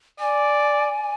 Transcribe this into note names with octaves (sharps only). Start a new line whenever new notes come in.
D5 G#5